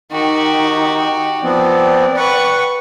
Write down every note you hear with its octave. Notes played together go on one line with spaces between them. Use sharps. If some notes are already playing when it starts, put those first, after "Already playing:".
D#3 D#4 F#4 G4 G5
F3 B3 C4 D5
B4 F#5 C#6